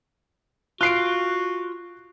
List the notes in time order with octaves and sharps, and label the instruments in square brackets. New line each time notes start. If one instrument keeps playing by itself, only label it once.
[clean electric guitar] F4 [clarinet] F#4 [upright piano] F#6 C7 D7